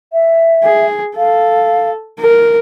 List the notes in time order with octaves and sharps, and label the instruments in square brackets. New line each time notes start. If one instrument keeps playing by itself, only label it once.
[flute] E5
[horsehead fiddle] G#4
[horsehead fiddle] A4 [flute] F5
[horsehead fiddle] A#4